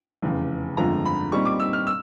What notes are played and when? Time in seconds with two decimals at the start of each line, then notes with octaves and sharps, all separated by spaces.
0.22 F1 E2 C#3
0.77 G1 F2 D3 F3 G#3 A#5
1.05 B5
1.32 A#2 G3 C4 D#4 C#6
1.45 D6
1.60 E6
1.73 F6
1.87 E6